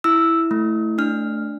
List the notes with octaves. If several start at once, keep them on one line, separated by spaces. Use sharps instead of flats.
E4 E6
A3
D4 F6